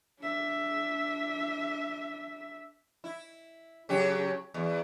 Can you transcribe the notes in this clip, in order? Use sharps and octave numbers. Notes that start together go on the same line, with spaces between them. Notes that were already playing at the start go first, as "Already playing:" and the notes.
D4 E5
E4
C#3 F#3 G4
E2